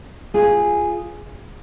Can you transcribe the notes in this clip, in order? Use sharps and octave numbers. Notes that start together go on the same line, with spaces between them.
F4 G#4